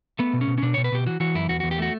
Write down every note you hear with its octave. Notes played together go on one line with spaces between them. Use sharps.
A3 B3
B2
C#4
B2
C#4
B2 D4
B2 C#5
B4
B2 G4
E3 F#4
E3 F#4
F#2 E4
E2 F#4
E2 F#4
G4
A3 F#4